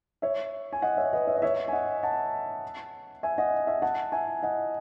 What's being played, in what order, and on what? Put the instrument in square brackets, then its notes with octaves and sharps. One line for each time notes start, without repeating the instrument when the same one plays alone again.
[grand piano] C#5 E5
G#5
D#5 F#5
C#5 E5
B4 D#5
C#5 E5
D#5
C#5 E5
G#5
D#5 F#5
F#5 A5
E5 G#5
D#5 F#5
E5 G#5
F#5 A5
E5 G#5
D#5 F#5